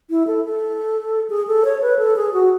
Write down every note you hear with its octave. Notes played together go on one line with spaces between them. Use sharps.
E4
A4
A4
G#4
A4
C#5
B4
A4
G#4
F#4